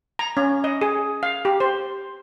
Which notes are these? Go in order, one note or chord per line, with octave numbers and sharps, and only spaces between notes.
A#5
C#4
D#5
G#4
F5
G4
C5